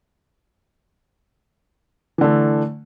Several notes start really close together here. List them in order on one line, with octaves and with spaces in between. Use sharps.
E3 D3 A3